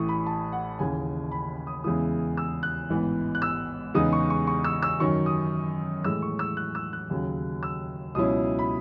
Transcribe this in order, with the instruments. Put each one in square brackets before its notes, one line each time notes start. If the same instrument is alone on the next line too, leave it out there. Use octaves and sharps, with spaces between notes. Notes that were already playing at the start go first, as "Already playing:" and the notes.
Already playing: [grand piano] A1 A2 E3 C#6 D#6
B5
A5
F#5
D#2 C#3 E3 G#5
B5
D#6
E2 C#3 G#3 B3 E4 D#6
E6
F#6
A1 G#2 E3 B3
F#6
E6
E2 C#3 G#3 B3 D#4 D#6
C#6
C#6
C#6
E6
E6
F#2 D#3 F#3 C#4 C#6
D#6
A2 E3 G#3 E6
C#6
E6
F#6
E6
F#6
D#2 C#3 F#3
E6
C#2 B2 F#3 C#4 E4 D#6
B5